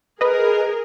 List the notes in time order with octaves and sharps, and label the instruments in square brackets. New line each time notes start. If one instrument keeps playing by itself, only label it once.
[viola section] G#4 A#4 [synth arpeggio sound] B4 D#5